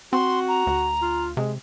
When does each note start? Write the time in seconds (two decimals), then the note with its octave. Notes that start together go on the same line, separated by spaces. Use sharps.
0.13 C4 F#4 C6
0.48 A#5
0.67 D2
1.02 F4
1.37 C3 G#3